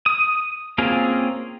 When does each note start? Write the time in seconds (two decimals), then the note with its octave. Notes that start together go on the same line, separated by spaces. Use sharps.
0.06 D#6
0.78 A#3 C4 C#4 F4 G#4